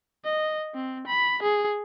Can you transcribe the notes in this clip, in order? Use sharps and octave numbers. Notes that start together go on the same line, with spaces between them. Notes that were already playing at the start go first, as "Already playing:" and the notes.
D#5
C4
B5
G#4